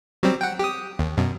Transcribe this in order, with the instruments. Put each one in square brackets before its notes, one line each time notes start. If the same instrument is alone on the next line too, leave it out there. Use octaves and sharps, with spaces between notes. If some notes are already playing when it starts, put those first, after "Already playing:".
[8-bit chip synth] F#3 G3 C4
F#5 G5
G4 D#6
D#2
F#2 B2